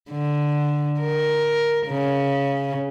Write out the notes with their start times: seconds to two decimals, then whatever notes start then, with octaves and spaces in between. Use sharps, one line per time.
0.11 D3
1.00 A#4
1.87 C#3